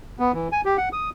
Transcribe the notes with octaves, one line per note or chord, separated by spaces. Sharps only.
B3
E3
G#5
G4
F#5
D#6